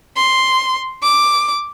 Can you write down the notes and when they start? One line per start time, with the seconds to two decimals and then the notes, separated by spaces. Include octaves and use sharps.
0.16 C6
1.03 D6